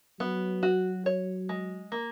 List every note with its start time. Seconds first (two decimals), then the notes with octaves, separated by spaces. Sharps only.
0.20 F#3 B3
0.63 F#4
1.06 C#5
1.49 G#3
1.92 A#3